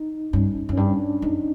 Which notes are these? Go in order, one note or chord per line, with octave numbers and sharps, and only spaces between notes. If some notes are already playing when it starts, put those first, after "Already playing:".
Already playing: D#4
G2 C#4
F#2
C#4
G2 D4
D4
F#2 D#4